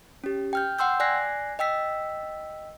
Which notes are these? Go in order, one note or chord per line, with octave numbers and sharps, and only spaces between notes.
C#4 G4
G5 F6 G6
F#5 G5 C6 E6 G6
D5 G#5 F#6 A#6 C7
D#5 G5 E6 B6